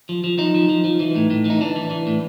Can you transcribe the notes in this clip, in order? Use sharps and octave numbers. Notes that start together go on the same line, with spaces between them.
F3
F3
F3 D#4
F3
F3
F3
E3
A2
A2
E3 D#4
E3 D4
E3
E3
A2